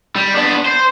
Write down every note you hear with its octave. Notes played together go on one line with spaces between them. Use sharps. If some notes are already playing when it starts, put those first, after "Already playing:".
G3
B3 D4
C5